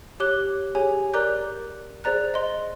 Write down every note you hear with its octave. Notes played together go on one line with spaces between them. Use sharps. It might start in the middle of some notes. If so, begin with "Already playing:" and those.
G4 C#5 D6 F#6 G7
G4 G#4 C#5 G#5
A#4 D5 A#5 D6 F#6 G6
G#4 C5 D5 A#5 F#6
D#5 C6